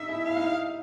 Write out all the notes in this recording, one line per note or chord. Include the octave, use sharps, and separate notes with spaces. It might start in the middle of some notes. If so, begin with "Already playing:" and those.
Already playing: D#4 E5
E4
E4 F5
D#4